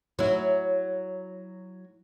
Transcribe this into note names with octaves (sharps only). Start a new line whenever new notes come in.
F#3 E4